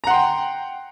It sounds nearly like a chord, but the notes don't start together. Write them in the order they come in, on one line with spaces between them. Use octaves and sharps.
A#5 F#5 C6 G5